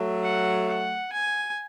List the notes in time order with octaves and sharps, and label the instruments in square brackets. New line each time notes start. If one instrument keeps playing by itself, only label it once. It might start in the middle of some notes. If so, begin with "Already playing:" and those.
Already playing: [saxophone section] F#3 A3
[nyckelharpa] F#5
F#5
G#5